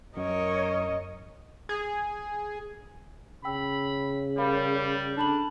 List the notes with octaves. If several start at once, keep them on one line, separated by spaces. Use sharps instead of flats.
F#2 A#4 C#5 D#5
G#4
C#3 G5 B5 E6
G3 A#4 F5 B5
D4 A4 B5 F#7